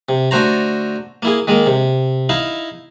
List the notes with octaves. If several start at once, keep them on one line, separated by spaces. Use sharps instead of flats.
C3
D3 A3 F#4 C5 A#5
A#3 E4 G#4
D#3 G#3 A#3
C3
D#4 E4 E5 F5